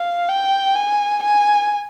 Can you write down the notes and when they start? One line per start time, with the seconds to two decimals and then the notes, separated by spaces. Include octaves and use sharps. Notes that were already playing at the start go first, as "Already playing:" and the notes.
Already playing: F5
0.29 G5
0.75 G#5
1.23 G#5